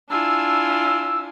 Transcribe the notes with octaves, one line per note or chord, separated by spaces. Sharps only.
D4 E4 F4 G#5 E6